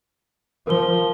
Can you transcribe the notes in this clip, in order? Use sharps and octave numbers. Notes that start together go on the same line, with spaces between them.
F3 A#4 G7